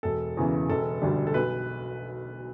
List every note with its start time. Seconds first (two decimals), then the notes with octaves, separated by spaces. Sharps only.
0.03 E1 A4
0.37 E2 C#3 E3
0.69 E1 A4
1.01 D2 D3 G3 D4
1.27 A4
1.34 B1 B4